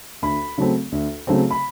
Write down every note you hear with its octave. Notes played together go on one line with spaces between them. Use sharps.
D2 B5
C#3 F#3 A3 C4
D2
C#3 F#3 A3 C4
B5